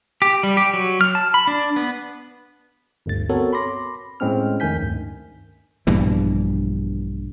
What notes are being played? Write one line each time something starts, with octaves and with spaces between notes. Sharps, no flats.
G4
G3
G4
F#3
F6
A5
B5
D4
B3
G1 D2 G2 A6
B3 C4 F#4 A4 A#4 C#5
B5 C6 D6 A#6
A2 G#3 C4 C#4 F6
F2 D#3 A3 G#5 G6 B6
D2 G2
A#1 G2 B2 E3